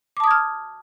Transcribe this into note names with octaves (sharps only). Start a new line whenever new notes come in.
A5 D6 D#6 F6 G#6